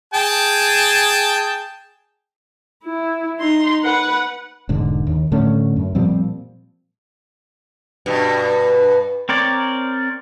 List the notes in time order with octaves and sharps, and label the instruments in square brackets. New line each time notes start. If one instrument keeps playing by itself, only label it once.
[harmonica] G#4 G5 A5
[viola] E4
D#4 C6
B4 F#5
[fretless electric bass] E1 G#2 D3
D#2
A2 D3 A3 C#4
F#2
A#2 F3 G3 C4
[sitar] G2 B2
[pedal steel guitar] C4 A#4 C#5 D5